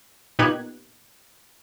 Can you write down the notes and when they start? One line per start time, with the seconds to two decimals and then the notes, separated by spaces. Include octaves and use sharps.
0.39 A#2 B3 D#4 G4 F#6 G#6